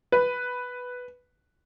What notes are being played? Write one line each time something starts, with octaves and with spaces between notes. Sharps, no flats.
B4